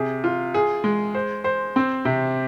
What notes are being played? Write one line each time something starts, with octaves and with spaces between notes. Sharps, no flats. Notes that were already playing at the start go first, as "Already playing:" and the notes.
Already playing: C3 G#4
F4
G#4
G#3
C5
C5
C4
C3